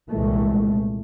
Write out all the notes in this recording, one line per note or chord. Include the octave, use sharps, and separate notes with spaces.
C2 A#2 E3 G#3 A3